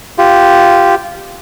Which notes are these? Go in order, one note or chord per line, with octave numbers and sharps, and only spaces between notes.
F4 G4